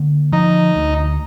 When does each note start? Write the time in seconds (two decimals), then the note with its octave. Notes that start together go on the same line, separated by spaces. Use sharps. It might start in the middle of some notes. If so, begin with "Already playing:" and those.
Already playing: D3 A#3
0.32 F3 D#4
0.76 D2